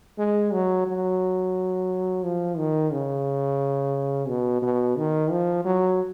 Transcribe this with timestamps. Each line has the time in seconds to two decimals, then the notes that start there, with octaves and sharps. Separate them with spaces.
0.18 G#3
0.53 F#3
0.86 F#3
2.23 F3
2.57 D#3
2.92 C#3
4.28 B2
4.62 B2
4.97 D#3
5.31 F3
5.65 F#3